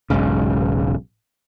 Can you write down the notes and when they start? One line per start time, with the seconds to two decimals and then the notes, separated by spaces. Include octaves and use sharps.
0.10 E1 B1 G#2 C#3